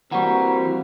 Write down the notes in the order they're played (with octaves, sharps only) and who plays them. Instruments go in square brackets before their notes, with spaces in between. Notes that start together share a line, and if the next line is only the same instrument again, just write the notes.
[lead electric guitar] E3 G3 [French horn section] A#3 C4 F#4 [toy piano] F#5 C#6 [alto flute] A#5